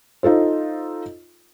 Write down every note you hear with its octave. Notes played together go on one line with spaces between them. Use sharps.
D#4 F4 A4 C5